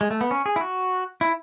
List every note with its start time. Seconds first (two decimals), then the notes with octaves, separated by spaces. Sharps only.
0.01 G#3
0.11 A3
0.21 B3
0.31 C#4
0.46 G#4
0.56 E4
0.61 F#4
1.21 E4